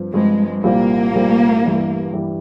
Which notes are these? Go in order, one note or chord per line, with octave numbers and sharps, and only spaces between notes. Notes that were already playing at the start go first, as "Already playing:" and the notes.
Already playing: G2 F3 C4
G2 F3 G#3 C4
C2 A#2 G3 A#3 C4 F4
C2 A#2 G3 C4 F4
G2 E3 G3
G2 E3 G3